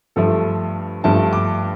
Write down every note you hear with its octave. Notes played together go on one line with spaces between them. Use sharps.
G2 F3 A3 A4
G2 F3 A3 A5
D6